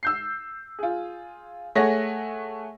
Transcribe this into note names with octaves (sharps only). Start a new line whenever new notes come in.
E6 G6 C7
F4 G#4
A3 G#4 C#5 F#5 A#6